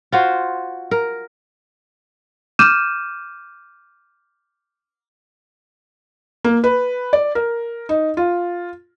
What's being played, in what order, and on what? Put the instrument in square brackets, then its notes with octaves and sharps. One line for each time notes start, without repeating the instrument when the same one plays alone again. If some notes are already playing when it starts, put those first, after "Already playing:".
[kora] F4 F#4 C5
A#4
[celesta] D6 F6 G6 D#7 E7
[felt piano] A#3
B4
D5
A#4
D#4
F4